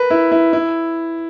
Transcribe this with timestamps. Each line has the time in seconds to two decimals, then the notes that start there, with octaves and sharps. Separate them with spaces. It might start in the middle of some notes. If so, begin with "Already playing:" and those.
Already playing: A#4 B4
0.10 E4
0.32 E4
0.53 E4